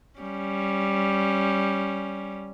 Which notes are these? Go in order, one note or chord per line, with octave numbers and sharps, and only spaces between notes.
G3 C#4